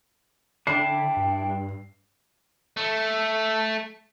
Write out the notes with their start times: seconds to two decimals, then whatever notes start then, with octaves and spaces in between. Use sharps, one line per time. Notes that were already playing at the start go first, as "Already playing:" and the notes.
0.67 D3 D4 E4 G5 C7
1.17 G2
2.77 A3